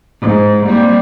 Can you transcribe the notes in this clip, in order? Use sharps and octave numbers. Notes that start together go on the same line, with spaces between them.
G#2
G3 A#3 C4